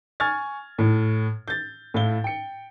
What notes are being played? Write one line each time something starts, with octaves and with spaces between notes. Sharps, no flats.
G#5 C#6 F6 G#6 A6
A2
G6 A6
A2 E4 F5 G7
G5 C#7